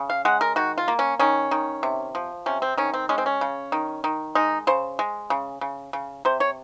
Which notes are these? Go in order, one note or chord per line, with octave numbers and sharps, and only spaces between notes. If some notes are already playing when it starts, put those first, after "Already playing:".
Already playing: C#3
F5
G#3 F#5
A#4
D#3 F#4
F4
A#3
C#4
D#3 C#4
D#3
C3
F3
C3 C#4
C4
D#3 C#4
C4
G#3 C#4
C4
C#4
C#3
D#3
D#3
G#3 D#4
C#3 C5
G#3
C#3
C#3
C#3
C3 C5
C#5